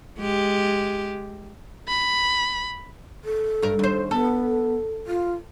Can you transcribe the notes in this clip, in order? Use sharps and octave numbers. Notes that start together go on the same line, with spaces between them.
G#3 G4
B5
A4
G2 A#4
D#2 C5
B3 A4
F4